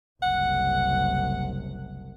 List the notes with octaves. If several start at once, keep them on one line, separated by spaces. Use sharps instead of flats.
F#1 C2 F#5